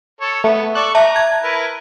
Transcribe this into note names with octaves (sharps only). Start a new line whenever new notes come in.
A4 C#5
A3 B3
A4 D5 C#6 F#6
E5 A5 A#5
G#6
E4 A#4 B4